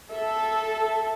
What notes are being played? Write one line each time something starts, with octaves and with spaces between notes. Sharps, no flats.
A4 E5